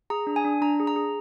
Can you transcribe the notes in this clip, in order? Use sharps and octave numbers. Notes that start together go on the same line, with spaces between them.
G#4 A#5
D4
G#5
D4
D4 A#5
G#4
A#5
G#4